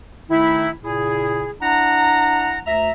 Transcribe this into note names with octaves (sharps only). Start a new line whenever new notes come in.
D#3 A3 D#4 E4
A#2 C#3 E4 G#4
D4 E4 F#5 A#5
D2 E5 A#5